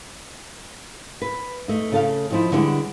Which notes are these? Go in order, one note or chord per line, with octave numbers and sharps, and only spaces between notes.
B4
A3 D#4
C#3 A4 F5
D#3 F3 E4
D3 G3 G#3 B3 D4 E4